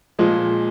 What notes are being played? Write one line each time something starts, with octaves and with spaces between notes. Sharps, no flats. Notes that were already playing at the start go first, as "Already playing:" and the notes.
A#2 F3 G#3